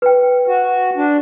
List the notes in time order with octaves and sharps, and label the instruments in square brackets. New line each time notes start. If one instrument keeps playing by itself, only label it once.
[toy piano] B4 G5
[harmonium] F#4
D4